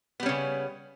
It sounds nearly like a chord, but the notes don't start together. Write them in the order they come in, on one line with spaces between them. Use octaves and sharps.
B3 G3 C#4 C#3